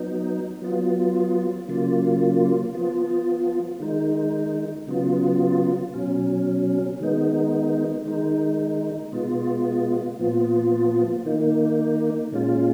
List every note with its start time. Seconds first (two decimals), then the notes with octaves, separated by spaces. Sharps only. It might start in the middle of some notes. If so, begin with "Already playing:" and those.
Already playing: F#3 B3 D#4
0.62 F#3 B3 F4
1.68 C#3 F#3 A#3 F4
2.75 F3 B3 F4
3.80 D#3 G#3 D#4
4.87 C#3 F#3 B3 F4
5.94 B2 F#3 C#4
7.00 D#3 G#3 B3 D#4
8.05 D#3 G#3 D#4
9.12 B2 G#3 B3 F4
10.19 A#2 F3 B3 F4
11.25 D#3 A#3 D#4
12.32 A#2 G#3 C#4 F4